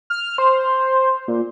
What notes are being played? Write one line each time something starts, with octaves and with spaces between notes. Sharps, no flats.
F6
C5
A#2